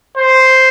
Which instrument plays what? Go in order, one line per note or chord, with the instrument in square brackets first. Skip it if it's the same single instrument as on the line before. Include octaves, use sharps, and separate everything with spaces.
[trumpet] C5